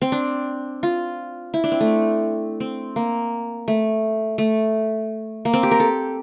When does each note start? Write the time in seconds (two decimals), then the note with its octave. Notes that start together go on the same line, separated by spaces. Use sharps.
0.02 C4
0.12 D4
0.83 F4
1.54 E4
1.64 D4
1.72 C4
1.80 A3
2.60 C4
2.96 A#3
3.68 A3
4.38 A3
5.45 A#3
5.53 C4
5.63 G4
5.71 A#4
5.80 A4